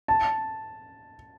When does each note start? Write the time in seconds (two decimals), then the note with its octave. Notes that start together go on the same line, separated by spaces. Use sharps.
0.08 A5